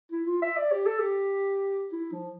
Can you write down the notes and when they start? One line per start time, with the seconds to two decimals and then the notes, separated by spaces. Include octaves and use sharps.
0.12 E4
0.27 F4
0.42 E5
0.57 D5
0.72 G4
0.86 A4
0.99 G4
1.92 E4
2.12 F3